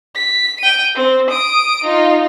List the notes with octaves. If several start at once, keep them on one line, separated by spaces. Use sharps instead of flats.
B6
G5 D#7
C4
D#6 D7
D#4 F4